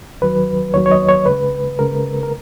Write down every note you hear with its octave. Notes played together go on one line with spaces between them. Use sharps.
D#2 D#3 F#3 B4
D#2 D#3 F#3 C#5
C#5
D#5
C#5
C#2 C#3 G#3 B4
C#2 C#3 G#3 A#4
A#4